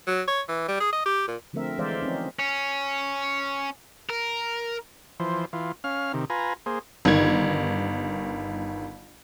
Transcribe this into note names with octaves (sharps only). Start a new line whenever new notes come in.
F#3
C#5
E3
G3
G#4
D#5
G4
A#2
D3 F3 A3 C4 A#4 E5
E3 G#3 C5 D5 E5 F5
F3 C4 C#4 D#4
C#4
A#4
E3 F3 C5
E3 F4
C#4 F5 F6
C3 D#3
F4 B4 G#5 A#5
A#3 G#4 C5
G1 D#3 G#6